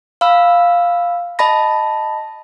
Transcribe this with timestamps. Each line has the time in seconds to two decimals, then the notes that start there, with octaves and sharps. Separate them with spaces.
0.21 F5 B5 E6
1.39 D#5 A5 B5 A#6